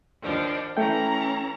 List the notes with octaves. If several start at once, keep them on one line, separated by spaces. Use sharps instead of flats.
D#2 F3 D4
E3 A3 C#4 G5 A#5